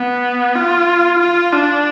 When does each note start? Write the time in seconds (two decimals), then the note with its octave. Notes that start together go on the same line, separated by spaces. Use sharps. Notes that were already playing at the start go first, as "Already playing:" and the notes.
Already playing: B3
0.56 F4
1.20 F4
1.53 D4